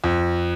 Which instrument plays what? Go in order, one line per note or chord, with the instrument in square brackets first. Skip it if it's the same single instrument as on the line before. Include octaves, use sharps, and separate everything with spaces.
[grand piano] F2